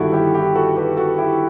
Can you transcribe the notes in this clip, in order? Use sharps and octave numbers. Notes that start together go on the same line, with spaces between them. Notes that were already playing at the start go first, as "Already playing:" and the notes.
Already playing: G1 G2 D#3 E4 F#4 G4 A4
E4 G4
E4 G4
F#4 A4
G4 B4
F#4 A4
E4 G4